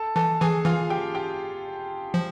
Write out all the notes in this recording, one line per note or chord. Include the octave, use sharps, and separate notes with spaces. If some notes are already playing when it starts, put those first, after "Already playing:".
Already playing: A4 A5
E3 A4 A5
E3 G#4 G#5
E3 F4 F5
G4 G5
G4 G5
F3